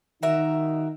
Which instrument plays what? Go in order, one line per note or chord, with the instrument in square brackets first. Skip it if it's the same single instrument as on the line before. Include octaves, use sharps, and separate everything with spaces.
[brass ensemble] D#3 D#4 [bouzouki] F#4 A#4 E5